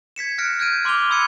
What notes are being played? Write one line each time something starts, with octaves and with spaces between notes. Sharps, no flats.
G#6 B6 C#7 E7
F6 F#6 A#6 C#7 D7
F6 G6 G#6 D7 D#7
C6 D6 F6 F7 G7
B5 E6 G#6 C#7 D#7